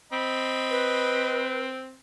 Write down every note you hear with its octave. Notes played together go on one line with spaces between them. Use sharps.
C4 D#5 B5
B4